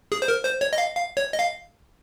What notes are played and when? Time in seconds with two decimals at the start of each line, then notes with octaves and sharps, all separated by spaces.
0.12 G#4
0.22 C5
0.28 A#4
0.45 C5
0.61 C#5
0.73 D#5
0.78 F5
0.95 F5
1.17 C#5
1.33 D#5
1.39 F5